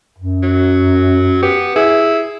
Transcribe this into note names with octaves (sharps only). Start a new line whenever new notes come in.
F#2
F#3
B3 G4
E4 G#4